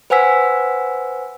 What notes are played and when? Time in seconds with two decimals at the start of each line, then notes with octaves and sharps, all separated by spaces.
0.10 B4 C5 F#5 G#5 E6 B6